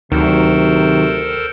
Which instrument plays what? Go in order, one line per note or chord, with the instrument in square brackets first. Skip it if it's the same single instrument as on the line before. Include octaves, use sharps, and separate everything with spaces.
[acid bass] D2 [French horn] C3 [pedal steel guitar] D#3 F#3 [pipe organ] A4 A#4 C5